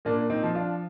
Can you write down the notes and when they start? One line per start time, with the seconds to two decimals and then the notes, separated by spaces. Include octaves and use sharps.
0.05 A#2 A#3 D4
0.30 C4 D#4
0.43 F3
0.55 D4 F4